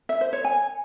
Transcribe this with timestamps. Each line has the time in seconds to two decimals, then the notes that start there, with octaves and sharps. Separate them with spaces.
0.09 E5
0.21 C5
0.33 C#5
0.45 G#5